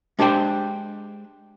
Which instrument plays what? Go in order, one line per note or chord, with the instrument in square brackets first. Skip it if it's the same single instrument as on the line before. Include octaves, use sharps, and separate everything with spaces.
[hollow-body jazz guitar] G#3 D4 G4 C5 G5